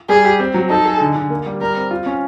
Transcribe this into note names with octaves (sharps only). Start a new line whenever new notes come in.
G3 G#4
G4
C4
F#3
D#4 A4
G#4
D3
D3
A#3
G3
G3 A#4
C4
F4
C#4